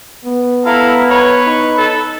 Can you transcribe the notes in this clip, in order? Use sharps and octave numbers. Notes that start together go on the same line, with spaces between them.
B3
E4 A4 F5 A#5
B4 C#5
D#4
A4